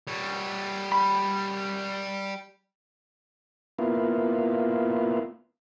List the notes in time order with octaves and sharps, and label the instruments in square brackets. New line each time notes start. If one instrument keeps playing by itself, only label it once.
[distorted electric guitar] G3 C#5
[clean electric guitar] B5
[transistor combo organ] A#3 B3 E4 F4